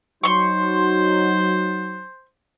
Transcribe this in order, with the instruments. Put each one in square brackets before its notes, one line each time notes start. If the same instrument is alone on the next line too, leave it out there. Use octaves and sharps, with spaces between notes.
[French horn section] F#3 D#4 [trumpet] C5 [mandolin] C6 C#6